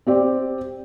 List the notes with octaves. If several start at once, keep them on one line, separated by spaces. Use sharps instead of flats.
C4 G4 D5